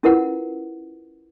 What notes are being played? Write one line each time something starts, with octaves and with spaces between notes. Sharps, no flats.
C#4 E4 F4 A#4 B4 F#5